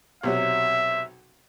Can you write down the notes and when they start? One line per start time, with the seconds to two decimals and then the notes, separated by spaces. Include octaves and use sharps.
0.23 B1 C3 F#3 E5